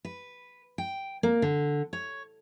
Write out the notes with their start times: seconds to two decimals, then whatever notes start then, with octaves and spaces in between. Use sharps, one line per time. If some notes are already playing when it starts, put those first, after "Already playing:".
0.05 B4
0.78 G5
1.23 A#3
1.42 D3
1.93 C#5